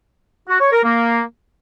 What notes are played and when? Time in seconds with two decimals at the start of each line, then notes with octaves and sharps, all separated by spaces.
0.49 F#4
0.60 C#5
0.72 A#4
0.84 A#3